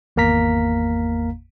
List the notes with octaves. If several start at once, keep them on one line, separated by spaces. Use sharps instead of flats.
G#1 E2 A#3 F5 A#5 B6